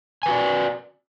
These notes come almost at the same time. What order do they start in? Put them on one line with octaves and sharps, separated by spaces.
G#5 B4 F#4 D5